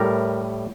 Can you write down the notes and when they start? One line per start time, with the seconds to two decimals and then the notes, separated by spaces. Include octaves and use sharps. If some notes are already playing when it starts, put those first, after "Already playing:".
Already playing: A2 G3 A#4